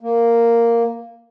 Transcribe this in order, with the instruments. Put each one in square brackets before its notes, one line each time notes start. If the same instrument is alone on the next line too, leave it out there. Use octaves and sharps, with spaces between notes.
[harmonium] A#3